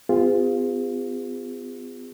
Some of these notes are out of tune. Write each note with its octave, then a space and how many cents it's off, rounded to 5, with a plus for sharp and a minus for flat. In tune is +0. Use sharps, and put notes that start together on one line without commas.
B3 +45 F4 +0 G#4 -40